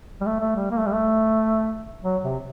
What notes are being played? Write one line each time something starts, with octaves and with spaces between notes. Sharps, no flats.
G3
A3
A3
G3
A#3
A3
G3
A3
F#3
C3